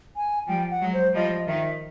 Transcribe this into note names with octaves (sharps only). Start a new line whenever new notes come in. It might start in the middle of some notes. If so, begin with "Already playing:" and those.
G#5
F3 G3 G5
F#5
F#3 G#3
C5
F3 G3 D#5
D#3 F3 E5